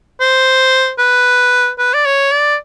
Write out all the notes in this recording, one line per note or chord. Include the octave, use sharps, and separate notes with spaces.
C5
B4
B4
D5
C#5
D5